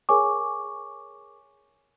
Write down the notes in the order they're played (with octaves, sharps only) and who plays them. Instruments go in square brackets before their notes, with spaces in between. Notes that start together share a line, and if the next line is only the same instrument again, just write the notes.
[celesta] G#4 A#4 C#5 G#5 C#6 D6